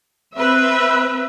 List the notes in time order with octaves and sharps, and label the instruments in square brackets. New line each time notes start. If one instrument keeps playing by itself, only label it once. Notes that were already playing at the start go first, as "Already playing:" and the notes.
[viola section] C4 B4 E5